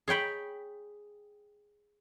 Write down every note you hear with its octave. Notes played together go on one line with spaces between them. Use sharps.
G#4 C#5 G5 B5